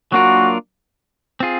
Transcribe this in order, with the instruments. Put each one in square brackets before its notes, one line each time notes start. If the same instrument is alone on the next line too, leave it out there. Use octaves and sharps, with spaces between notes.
[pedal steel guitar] F#3 A#3 D4 F4 A#4 [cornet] F#4
[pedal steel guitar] C4 F4 G#4